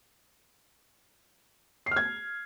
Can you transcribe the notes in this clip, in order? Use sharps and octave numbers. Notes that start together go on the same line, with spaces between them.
C7
F6
G#6